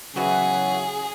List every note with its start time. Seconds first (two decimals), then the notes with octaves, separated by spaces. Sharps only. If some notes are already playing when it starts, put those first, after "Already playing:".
0.16 C#3 E3 F#3 B3 F#4 G#4